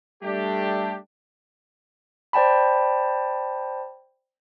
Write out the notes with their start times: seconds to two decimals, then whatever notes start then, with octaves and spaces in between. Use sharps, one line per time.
0.23 G3 A3 D4 G4
2.33 C5 D5 G5 A5 B5